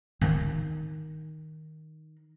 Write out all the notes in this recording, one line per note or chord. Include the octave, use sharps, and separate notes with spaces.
D#3 D#4